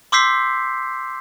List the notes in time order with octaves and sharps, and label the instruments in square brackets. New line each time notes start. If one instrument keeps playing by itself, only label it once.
[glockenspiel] C6 D6 E6 G6 B6 C7